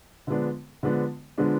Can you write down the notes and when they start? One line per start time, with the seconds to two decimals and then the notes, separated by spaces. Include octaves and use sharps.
0.27 D3 F3 G#3 B3 D4
0.83 D3 F3 G#3 B3 D4
1.38 D3 F3 G#3 B3 D4